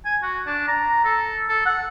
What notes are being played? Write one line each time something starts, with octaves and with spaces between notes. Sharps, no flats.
G#5
F#4
D4
A#5
A4
A4
F#5